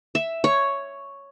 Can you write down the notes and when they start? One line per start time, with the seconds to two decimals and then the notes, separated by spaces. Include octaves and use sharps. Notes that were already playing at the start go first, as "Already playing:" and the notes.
0.15 E5
0.44 C#5